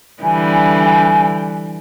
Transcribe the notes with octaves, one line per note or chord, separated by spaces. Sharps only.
D3 E3 G3 G#5